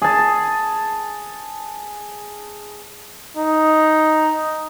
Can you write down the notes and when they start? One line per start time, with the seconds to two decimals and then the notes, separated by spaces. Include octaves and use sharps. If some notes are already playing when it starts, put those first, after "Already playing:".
0.02 G#4 A5
3.37 D#4